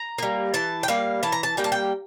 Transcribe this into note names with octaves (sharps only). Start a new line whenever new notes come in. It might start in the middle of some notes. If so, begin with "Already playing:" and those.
Already playing: A#5
G3 A#3
E3 A5
G5
G3 A#3 F5
E3 A5
A#5
A5
G3 A#3 G5
A5
G5